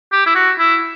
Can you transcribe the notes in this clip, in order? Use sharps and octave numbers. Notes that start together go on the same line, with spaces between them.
G4
E4
F#4
E4